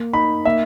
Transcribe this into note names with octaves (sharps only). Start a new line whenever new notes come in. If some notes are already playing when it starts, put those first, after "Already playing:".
Already playing: A#3
D#4 B5
A#3 E5